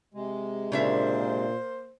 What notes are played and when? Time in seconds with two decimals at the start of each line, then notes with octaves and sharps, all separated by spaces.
0.14 C3 G#3
0.72 A#2 C#3 A#3 D4 C5 E5